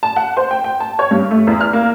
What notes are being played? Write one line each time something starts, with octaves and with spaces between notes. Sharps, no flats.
A5
F#5
C5
G5
G5
A5
C#5
G2
A3
E2
F6
A#3